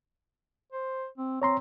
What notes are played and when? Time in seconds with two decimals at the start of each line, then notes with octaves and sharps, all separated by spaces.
0.72 C5
1.18 C4
1.42 C4 C#5 A#5 C6